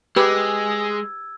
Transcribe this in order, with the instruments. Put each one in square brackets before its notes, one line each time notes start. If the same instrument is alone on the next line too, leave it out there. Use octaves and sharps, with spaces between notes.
[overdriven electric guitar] G#3 [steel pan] G4 B4 D6 [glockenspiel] E6 G#6